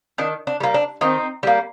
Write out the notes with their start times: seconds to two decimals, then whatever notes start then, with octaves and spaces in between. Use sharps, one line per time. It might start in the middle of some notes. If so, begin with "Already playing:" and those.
0.18 D#3 D4
0.47 D4
0.60 G3 A#3
0.74 D4
1.01 D#3 C4 D#4
1.43 G3 A#3